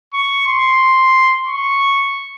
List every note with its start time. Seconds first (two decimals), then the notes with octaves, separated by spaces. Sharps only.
0.14 C#6
0.47 C6
1.47 C#6